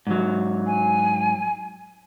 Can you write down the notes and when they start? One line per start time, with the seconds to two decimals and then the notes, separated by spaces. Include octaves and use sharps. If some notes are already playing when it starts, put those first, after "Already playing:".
0.07 G#2 F#3
0.66 G#5